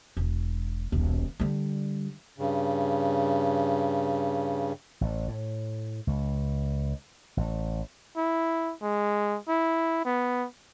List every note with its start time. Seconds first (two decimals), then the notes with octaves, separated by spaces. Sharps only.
0.17 E1
0.92 D#1 B1
1.40 D3 G3
2.38 G2 C#3
5.01 A1
5.28 A2
6.07 C#2
7.37 A1
8.17 E4
8.82 G#3
9.48 E4
10.05 B3